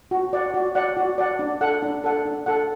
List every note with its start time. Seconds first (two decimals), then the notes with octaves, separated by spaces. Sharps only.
0.11 F#4
0.33 D5 F#5
0.54 F#4
0.75 D5 F#5
0.97 F#4
1.18 D5 F#5
1.39 D4
1.61 A4 F#5
1.83 D4
2.04 A4 F#5
2.26 D4
2.46 A4 F#5